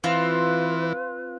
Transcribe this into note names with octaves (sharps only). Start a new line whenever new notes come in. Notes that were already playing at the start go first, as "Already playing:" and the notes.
E3 C4 F4 B4